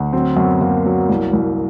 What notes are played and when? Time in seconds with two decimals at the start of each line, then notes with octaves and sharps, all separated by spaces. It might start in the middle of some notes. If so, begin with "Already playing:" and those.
Already playing: D2
0.13 F#3 C4
0.37 F#2 B3
0.61 F#2 A#3
0.86 F#3
1.10 C2
1.33 C2